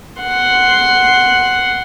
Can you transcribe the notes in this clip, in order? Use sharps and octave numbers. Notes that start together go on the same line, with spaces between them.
F#5 C6